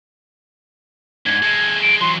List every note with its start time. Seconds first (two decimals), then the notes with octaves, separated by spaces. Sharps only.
1.26 G#2 D3 G#6
1.42 G#3 A4
1.82 D7
2.01 E3 F#3 C6